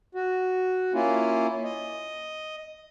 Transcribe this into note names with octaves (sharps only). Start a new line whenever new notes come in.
F#4
A#3 C#4 E4 F4
D#5